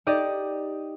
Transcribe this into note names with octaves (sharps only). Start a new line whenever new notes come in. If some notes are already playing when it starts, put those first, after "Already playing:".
D#4 G4 D5 D#5